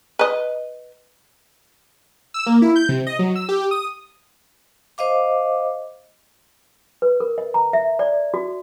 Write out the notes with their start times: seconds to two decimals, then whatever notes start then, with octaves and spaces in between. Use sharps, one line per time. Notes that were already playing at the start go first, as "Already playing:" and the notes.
0.19 B4 D#5
2.34 E6
2.46 A#3
2.62 E4
2.76 G6
2.89 C3
3.07 D#5
3.19 F#3
3.35 E6
3.49 G4
3.71 D#6
4.98 C5 D#5 F5 D6
7.02 B4
7.20 A#4
7.38 D#5
7.54 A#5
7.73 E5
7.99 D5
8.34 F#4